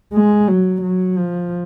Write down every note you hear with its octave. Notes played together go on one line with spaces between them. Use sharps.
G#3
F#3
F#3
F3